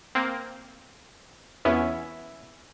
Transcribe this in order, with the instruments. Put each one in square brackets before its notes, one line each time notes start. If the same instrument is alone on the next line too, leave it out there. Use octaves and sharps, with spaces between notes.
[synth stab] A#3 C4
[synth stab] E2 B3 C#4 [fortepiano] E4